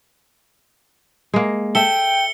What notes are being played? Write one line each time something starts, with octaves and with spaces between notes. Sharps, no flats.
G#3 A#3
A4 E5 G5 C#7 G7